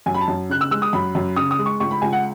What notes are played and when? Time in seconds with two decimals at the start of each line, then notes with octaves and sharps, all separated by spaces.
0.06 F#2 G#5
0.14 B5
0.21 A5
0.28 F#2
0.50 C#3 F#6
0.61 E6
0.71 G#3 E6
0.82 D#6
0.93 F#2 B5
1.15 F#2
1.36 C#3 D#6
1.51 D#6
1.59 G#3
1.66 C#6
1.80 C#2 C#6
1.91 B5
2.02 C#2 G#5
2.13 F#5